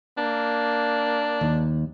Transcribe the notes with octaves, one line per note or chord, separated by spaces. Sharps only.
A#3 D4
D#2